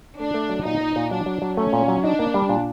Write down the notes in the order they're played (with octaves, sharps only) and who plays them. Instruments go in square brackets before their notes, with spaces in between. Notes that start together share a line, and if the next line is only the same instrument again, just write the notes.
[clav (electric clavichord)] A3 [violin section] D4
[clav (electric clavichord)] A3
F#3
[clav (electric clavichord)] A#2 [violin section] D#4
[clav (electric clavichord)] A#2
A#2
[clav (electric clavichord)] F#3 [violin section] D4
[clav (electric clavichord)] F#3
F#3
[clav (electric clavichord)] A3 [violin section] C#4
[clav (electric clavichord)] A#2
F#3
[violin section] D4 [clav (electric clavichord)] D#4
[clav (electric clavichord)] A#3
G3
A#2